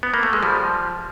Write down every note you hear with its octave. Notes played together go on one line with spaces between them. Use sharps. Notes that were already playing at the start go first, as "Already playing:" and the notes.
B3
A#3
A3
G#3
F3 G3